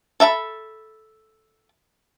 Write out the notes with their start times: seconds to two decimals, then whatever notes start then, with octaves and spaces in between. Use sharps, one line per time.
0.20 A4 E5 A#5 B5